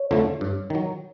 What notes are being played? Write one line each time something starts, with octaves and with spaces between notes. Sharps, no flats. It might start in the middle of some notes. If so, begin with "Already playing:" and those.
Already playing: C#5
F2 D3 F3 A3
G2
D#3 F#3